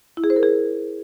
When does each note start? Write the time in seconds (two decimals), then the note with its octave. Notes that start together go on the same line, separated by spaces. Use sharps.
0.17 E4
0.24 G#4
0.30 C5
0.36 A#4
0.43 G#4